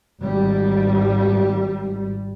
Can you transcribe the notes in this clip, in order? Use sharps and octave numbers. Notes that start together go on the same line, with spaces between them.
G#1 G3